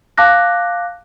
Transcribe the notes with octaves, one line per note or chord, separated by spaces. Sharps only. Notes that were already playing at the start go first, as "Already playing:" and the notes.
F5 A5 D6 F#6 A#6